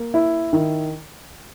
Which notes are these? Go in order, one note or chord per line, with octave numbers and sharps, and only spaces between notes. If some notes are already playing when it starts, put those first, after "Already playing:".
Already playing: A#3
E4
D#3